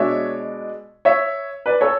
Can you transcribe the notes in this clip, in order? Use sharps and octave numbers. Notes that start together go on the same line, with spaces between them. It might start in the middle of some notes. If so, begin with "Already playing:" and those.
Already playing: B2 G#3 D4 C#5 E5
C#5 E5
B4 D5
A4 C#5